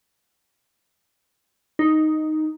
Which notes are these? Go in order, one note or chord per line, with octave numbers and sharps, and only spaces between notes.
D#4